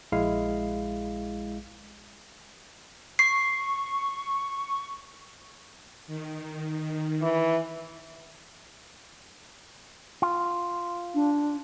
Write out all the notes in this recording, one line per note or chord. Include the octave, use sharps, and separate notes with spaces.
A#1 G#3 E4 F5
C#6 C7
D#3
E3
F4
D4